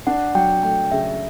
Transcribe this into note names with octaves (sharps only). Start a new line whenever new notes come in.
D4 F#5
F#3 G5
A3 G5
C#3 E5